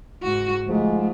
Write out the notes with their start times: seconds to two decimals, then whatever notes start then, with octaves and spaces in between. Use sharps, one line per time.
0.23 F#1 G#2 F#4
0.67 G1 G#2 F3 G#3 A3